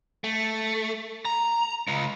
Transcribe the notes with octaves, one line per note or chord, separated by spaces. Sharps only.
A3
A#5
C#2